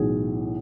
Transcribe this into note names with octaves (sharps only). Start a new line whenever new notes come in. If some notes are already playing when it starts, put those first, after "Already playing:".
Already playing: B1 A2 E3 G#4